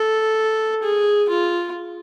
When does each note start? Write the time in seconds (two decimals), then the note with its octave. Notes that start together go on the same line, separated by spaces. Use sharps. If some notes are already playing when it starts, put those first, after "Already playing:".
Already playing: A4
0.83 G#4
1.29 F4